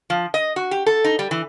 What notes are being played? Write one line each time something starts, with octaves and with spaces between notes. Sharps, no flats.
F3
D#5
F#4
G4
A4
D#4
G3
E3